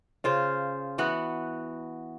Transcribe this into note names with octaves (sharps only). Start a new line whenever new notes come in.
C#3 F4 C5
E3 B3 F#4 F#5